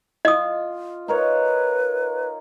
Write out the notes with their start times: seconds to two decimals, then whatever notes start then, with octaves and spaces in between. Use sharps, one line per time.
0.25 F4 D#5 D#6
1.08 D#4 A#4 B4 C#5